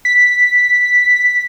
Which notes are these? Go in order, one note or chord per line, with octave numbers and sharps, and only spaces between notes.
B6